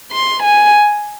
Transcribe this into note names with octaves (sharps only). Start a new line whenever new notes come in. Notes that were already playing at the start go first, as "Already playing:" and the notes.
C6
G#5